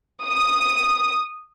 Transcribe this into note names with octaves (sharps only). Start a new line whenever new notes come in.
D#6